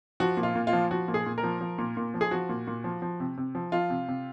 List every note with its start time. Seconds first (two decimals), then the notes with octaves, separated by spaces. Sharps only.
0.20 F3 F#4
0.37 A#2
0.43 F4
0.55 A#2
0.67 F4
0.73 F3
0.91 F3 F#4
1.08 A#2
1.14 G#4
1.26 A#2
1.38 A#4
1.43 F3
1.61 F3
1.78 A#2
1.97 A#2
2.14 F3
2.21 G#4
2.31 F3 F#4
2.49 A#2
2.67 A#2
2.84 F3
3.02 F3
3.20 C3
3.37 C3
3.55 F3
3.72 F3 F4
3.90 C3
4.08 C3